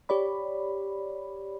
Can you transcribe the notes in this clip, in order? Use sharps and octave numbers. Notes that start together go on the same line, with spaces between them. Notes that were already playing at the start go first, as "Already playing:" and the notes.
G4 C#5 D5 B5